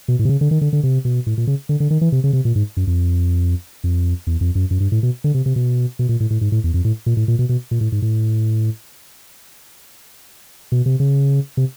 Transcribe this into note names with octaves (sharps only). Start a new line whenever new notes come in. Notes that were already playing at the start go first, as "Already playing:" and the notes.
B2
A2
C3
C#3
D3
D#3
D3
D3
C3
B2
A2
A#2
C#3
D3
D3
D#3
E3
C3
C#3
C3
A#2
G#2
F#2
F2
F2
E2
F2
F#2
F#2
G2
A2
B2
D3
C3
C3
B2
B2
A#2
A2
A2
G#2
A2
E2
F2
A2
A#2
A2
A#2
B2
B2
A#2
A2
G#2
A2
B2
C3
C#3
C3